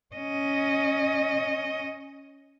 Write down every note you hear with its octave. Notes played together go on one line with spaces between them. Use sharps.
C#4 D#5